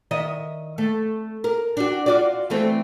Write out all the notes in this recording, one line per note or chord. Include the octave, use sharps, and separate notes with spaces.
D#3 D#5 E5
A3
A#4
D4 F#4
F4 F#4 D5
E3 A3 C4